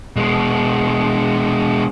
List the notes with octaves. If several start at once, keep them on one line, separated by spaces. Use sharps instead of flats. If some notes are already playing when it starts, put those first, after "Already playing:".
B2 G#3